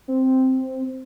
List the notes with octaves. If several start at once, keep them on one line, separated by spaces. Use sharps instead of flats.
C4